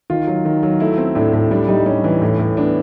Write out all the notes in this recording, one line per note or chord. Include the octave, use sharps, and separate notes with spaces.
D#3 F4
F#3
D#3
F#3
A3 E4
C4
A2 D4
A2
G3 D4
G3 D#4
G3 C#4
E3
A2
A2
B3 D4